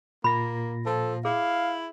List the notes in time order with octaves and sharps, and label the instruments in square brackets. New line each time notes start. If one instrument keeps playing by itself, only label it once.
[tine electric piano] A#2 A#6 [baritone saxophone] A#3 [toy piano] B5
[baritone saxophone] F3 [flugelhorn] A4
[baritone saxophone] E4 [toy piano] G#4 [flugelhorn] F5